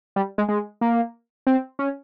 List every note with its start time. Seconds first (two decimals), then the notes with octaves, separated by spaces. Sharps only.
0.16 G3
0.38 G#3
0.49 G#3
0.81 A#3
1.47 C4
1.79 C#4